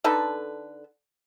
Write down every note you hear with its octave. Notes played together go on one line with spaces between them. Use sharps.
D3 D#4 A4 B4